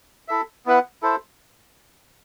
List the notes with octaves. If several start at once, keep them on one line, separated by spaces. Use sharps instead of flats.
E4 A4 E5
B3 E4 B4 F#5
E4 A4 C5